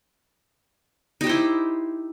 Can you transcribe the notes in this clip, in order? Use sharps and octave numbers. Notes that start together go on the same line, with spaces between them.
D#4 E4 G4 C5